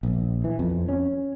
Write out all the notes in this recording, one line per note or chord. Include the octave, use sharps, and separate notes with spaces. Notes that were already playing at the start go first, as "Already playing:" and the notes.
A#1
E3
F2
C#4